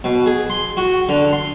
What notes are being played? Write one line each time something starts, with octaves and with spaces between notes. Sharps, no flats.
B2
G#4
C6
F#4
D3
C6